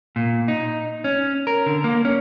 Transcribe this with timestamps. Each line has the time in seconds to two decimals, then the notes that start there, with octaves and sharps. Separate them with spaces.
0.16 A#2
0.48 D#4
1.04 C#4
1.47 A#4
1.66 D3
1.84 A#3
2.05 C#4